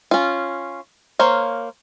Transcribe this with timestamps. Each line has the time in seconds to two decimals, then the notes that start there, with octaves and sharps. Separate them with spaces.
0.11 C#4 F4
1.19 A#3 C5 C#5 F5